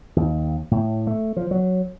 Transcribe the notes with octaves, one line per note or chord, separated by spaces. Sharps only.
D#2
A2
A3
F3
F#3